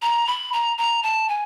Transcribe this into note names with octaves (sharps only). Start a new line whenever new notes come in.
A#5
B5
A#5
A#5
A5
G#5